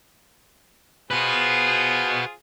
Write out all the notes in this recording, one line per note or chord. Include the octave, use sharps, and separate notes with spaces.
F4 F#4 G#4 B4 C5